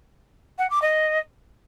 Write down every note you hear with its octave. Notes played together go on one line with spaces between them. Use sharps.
F#5
D6
D#5